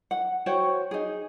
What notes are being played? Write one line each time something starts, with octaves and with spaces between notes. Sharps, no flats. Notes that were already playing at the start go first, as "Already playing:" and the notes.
F#5
F#4 C5 C#5 G5
D#4 G#4